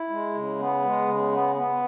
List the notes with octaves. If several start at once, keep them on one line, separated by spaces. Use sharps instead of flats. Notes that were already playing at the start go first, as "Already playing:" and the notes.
Already playing: E4
G#3
C#3
B3
G#3
C#3
B3
B3